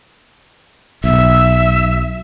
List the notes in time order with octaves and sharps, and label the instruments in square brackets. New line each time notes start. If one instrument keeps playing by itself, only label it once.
[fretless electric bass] B1 [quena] E5